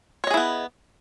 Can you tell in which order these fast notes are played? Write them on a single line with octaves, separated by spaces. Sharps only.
C#5 D#5 G#4 E4 B3